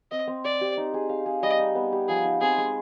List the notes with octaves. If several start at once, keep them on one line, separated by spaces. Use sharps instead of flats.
C4 D#5
C4
C5 D5
G4
D#4
G#4
F5
G#4
G3 D#5
D#4
B3
G4
F3 G#4
D#4
C4 G#4
G#3